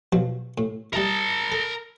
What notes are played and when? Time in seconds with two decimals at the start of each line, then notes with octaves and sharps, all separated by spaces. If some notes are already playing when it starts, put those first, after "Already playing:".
0.13 B2 F3 F#3
0.58 A2
0.93 G3 E4 A#4 A5
1.52 A4